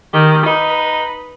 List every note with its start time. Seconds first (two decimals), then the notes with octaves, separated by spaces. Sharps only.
0.13 D#3 G4
0.46 D#4 B4